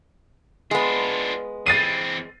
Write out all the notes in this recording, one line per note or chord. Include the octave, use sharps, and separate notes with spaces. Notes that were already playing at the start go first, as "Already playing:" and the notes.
G#3 B3 D4 F4
E3 C4 A6 C7 D#7